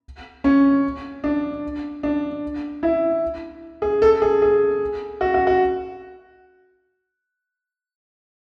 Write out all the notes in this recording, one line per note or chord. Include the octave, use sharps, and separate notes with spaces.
C#4
D4
D4
E4
G#4
A4
G#4
G#4
F#4
F#4
F#4